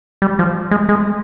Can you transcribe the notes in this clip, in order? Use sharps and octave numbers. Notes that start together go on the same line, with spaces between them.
G3
F3
G#3
G#3